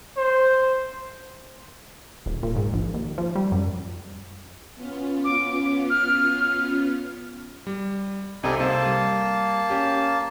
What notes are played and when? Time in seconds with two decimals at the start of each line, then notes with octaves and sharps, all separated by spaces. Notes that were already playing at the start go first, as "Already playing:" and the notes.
0.17 C5
2.26 D#1
2.43 A#2
2.56 G#2
2.73 A#1
2.94 D#2
3.18 F3
3.35 G3
3.52 F#2
4.75 B3 C#4 F4
5.24 D6
5.89 F6
7.67 G3
8.43 C2 G3 C4 D#4 A4 G#5
8.60 C3 A#3 C5 A5
8.86 G3
9.70 C#4 G4